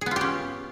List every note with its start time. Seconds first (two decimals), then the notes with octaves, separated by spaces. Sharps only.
0.01 G#4
0.06 B3
0.11 F4
0.16 G4
0.21 C#4